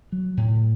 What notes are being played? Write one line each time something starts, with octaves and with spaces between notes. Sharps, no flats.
F#3
A2